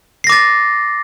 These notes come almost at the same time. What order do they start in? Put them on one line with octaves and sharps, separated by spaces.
C7 A#6 D6 A6